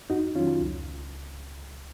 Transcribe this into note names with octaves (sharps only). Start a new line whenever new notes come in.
F2 D#4 F#4
D#3 F#3 C#4 F4
C#2